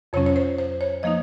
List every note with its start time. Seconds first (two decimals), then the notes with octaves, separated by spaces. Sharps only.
0.13 F2 C3 F#3 C#4 C#5
0.26 C#5
0.36 C5
0.58 C5
0.81 C#5
1.03 F3 A#3 D#4 D#5